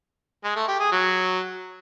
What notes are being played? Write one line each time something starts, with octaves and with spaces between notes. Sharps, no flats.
G#3
A3
G4
G#4
F#3